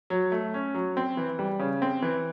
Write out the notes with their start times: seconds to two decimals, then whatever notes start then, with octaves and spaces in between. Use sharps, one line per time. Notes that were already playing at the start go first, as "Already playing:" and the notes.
0.10 F#3
0.32 A3
0.54 C#4
0.74 F#3
0.97 C4
1.17 E3
1.39 G3
1.60 C#3
1.82 C4
2.02 E3